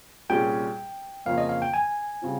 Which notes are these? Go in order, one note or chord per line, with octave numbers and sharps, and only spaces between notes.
C2 A#2 G3 C#4 G#4 G5
F2 C#3 F3 A#3 C#4 F5
D#5
F5
G5
G#5
C#3 G3 C4 F4